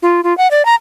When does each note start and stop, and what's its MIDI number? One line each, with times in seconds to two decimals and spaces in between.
0.02 0.21 65
0.24 0.36 65
0.38 0.50 78
0.51 0.65 74
0.65 0.75 82